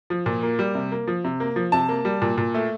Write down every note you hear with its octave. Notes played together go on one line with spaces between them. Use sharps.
F3
A#2
A#3
G3
C3
A#3
F3
C3
A#3
F3
C3 A5
A#3
G3
A#2
A#2
A3